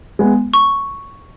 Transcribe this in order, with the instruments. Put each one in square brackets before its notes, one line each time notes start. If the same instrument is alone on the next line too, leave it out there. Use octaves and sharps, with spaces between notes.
[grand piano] G#3 B3
[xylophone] C#6